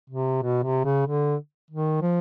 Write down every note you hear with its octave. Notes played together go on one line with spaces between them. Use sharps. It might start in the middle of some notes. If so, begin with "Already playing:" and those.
C3
B2
C3
C#3
D3
D#3
F3